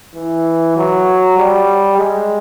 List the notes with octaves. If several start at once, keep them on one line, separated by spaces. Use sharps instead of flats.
E3
F#3
G3
G#3